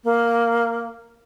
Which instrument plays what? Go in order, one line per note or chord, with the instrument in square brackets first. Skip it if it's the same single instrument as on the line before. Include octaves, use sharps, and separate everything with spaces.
[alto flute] A#3